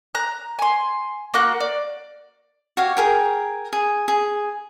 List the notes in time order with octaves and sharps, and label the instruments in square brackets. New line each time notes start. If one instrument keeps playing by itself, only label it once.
[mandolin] A#5 F#6
G#5 C6
A#3 F#4 F#6
D5
[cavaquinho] F#4 G4 C#5 F5
G#4 A#4 G5
G#4
G#4